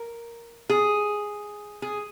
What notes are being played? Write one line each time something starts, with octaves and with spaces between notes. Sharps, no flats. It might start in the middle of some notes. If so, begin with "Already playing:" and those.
Already playing: A#4
G#4
G#4